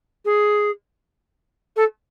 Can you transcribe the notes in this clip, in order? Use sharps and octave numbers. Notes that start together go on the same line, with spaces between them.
G#4
A4